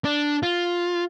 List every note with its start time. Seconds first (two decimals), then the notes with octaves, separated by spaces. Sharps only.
0.05 D4
0.43 F4